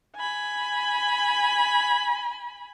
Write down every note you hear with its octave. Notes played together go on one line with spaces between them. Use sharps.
G#5 B5